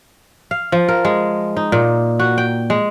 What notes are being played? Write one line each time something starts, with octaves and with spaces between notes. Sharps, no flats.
F5
F3
A#4
G#3
D#4
A#2
F#4
G5
G#3